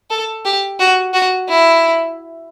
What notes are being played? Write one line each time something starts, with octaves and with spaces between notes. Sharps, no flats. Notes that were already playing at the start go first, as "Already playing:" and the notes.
A4
G4
F#4
F#4
E4